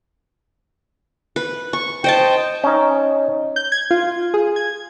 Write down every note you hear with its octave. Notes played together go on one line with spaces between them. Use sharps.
B4
C#6
C5 D#5 G5 A5
C#4 D#4
G6
G#6
F4
G#4
G#6